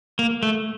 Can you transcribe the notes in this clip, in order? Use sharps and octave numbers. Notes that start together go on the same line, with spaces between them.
A#3
A3